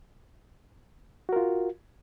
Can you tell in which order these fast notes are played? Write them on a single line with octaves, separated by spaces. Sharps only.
F#4 A#4 F4